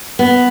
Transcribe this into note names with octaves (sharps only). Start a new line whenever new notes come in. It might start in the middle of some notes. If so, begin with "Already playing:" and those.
B3